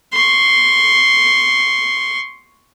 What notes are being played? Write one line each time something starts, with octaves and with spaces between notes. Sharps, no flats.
C6 C#6